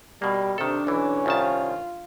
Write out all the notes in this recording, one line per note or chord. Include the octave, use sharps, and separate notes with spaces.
B2 G3 A#3
C3 D#3 D4 A4
B1 E3 C#4
C2 D#3 F4 A5